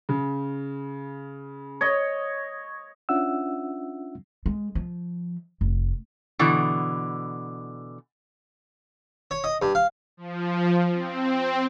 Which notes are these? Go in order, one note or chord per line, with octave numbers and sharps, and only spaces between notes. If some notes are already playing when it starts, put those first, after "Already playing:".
C#3
C#5 D#5
C#4 D4 F4 E5 F#5 E6
G#3
F3
F1
B2 D3 E3
C#5
D#5
G2
F5
F3
C4